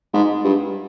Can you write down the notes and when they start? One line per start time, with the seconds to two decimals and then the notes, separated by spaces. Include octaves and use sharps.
0.13 G#2
0.44 G2